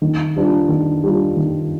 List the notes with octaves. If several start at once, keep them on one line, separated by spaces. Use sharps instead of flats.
D#3
G3 D4 F4
D#3
G3 D4 F4
D#3